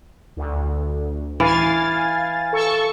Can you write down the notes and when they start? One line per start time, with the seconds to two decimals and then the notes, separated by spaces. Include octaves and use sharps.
0.37 D2
1.40 E3 F5 G#5 A6
2.53 A4 C#6